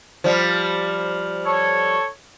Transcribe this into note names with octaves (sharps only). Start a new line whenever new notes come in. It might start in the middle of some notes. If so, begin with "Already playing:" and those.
F3 G3
A4 C#5